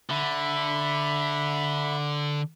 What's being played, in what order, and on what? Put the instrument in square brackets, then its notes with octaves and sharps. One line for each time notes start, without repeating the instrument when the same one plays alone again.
[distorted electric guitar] D3 [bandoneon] E5 B5